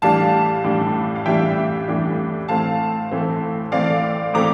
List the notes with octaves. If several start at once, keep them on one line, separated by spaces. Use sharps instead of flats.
A2 E3 G3 D4 F5 A5
A2 E3 G3 D4
F5
A2 E3 G3 D4 E5 G5
A2 E3 G3 D4
A2 E3 A3 C4 F5 A5
A2 E3 A3 C4
A2 E3 A3 C4 D5 F5
A2 E3 A3 C4 A#5 D6